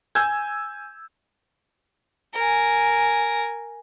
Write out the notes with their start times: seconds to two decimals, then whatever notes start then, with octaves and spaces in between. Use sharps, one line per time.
0.15 G#5 E6 G6 G#6
2.34 A#4 G#5